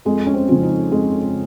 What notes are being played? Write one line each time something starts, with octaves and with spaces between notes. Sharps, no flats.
F2 G#3
C#4
C4
C#3 F3
D#4
F2 G#3